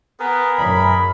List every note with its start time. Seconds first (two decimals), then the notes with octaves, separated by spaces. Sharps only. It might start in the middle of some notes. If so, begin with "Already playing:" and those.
0.20 B3 G#4 A#4
0.57 F#2 B5